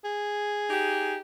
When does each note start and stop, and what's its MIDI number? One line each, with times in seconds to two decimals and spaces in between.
0.05 1.16 68
0.70 1.18 63
0.70 1.18 67